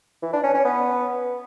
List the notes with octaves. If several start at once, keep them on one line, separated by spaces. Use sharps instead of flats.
E3
D4
C#4
C#4
B3